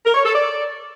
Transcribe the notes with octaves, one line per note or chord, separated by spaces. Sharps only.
A#4
C#5
A4
D5